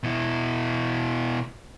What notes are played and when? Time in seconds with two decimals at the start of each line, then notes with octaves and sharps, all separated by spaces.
0.03 B2 E4